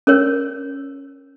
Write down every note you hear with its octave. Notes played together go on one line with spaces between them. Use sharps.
C#4 A#4 C#5